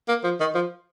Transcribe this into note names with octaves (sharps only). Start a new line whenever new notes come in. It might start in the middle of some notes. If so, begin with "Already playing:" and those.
A#3
F3
D#3
F3